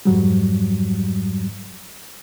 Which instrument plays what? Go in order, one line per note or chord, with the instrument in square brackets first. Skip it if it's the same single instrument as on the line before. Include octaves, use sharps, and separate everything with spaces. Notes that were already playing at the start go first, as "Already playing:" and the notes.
[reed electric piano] F2 G#2 F#3 G3